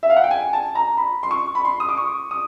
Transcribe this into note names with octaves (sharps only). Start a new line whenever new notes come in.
E5
F5
F#5
G5
G#5
A5
A#5
B5
C6
C#6
B5
C6
D#6
D6
C#6
D#6